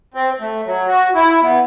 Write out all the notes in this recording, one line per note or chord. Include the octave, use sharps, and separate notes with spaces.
C4
A3
F#3
F#4
E4
B3